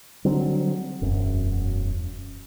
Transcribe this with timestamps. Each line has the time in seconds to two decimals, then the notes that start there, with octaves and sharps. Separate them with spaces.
0.25 D3 F#3 G3 C4
1.02 E1 F#2